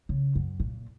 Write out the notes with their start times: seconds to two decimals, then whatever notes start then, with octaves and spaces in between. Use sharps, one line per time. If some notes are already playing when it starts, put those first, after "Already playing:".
0.09 C#3
0.35 F#2
0.60 A#2